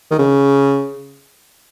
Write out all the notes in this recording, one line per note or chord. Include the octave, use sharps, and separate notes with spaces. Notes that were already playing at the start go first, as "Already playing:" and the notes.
D#3
C#3